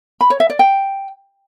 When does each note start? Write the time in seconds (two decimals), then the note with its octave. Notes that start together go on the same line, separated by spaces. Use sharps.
0.21 B5
0.30 C#5
0.40 E5
0.50 D5
0.59 G5